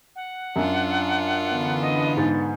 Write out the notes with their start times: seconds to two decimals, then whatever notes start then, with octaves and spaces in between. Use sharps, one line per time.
0.15 F#5
0.56 F#2 D4 F4
1.50 D3 E3 B3
1.81 D#5
2.17 G#2 A6